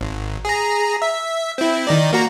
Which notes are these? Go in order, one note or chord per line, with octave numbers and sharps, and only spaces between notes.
G#1
G#4 A#5
E5
C4 E4
D#3 D#4 D5
A#3 F#4 A#5